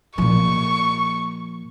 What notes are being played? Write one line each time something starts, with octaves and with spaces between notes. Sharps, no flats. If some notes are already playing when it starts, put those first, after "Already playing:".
A#2 F3 C#6